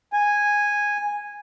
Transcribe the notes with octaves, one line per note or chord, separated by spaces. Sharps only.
G#5